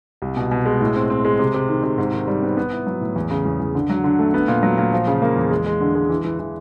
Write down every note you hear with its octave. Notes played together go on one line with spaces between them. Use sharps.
C2
B2
B2
G#3
A2
C4
C4
G#3
C3
C3
D#3
C3
G#2
D#3
G3
B3
B3
E4
F#3
A2
E2
C#3
E2
E2
D3
F#3
D3
A3
B3
A#2
F#3
A#2
F3
C#3
A#3
E2
G#3
G#3
D3
G#3
E3
E3
E3